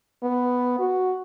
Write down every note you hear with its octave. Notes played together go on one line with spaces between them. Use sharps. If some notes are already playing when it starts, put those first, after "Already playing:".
B3
F#4